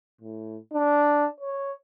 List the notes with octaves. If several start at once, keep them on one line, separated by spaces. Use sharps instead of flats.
A2
D4
C#5